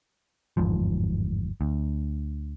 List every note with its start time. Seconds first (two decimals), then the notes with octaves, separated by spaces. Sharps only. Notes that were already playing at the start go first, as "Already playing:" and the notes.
0.57 G1 E2 G#2 F3
1.61 D2